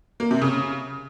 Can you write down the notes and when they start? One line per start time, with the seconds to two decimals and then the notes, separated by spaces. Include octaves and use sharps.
0.20 A#3
0.31 C3
0.42 C#3